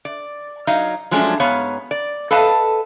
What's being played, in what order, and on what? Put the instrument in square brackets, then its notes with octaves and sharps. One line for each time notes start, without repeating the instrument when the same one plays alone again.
[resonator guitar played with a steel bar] D5
F#3 D#4 D#5 F5
F3 F#3 G#3 A3 C#4 D4
G#2 B3 C#5 F5
D5
A4 B4 D#5 F5 A5